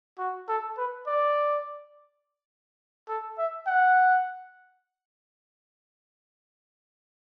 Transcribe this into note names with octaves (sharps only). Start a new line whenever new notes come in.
F#4
A4
B4
D5
A4
E5
F#5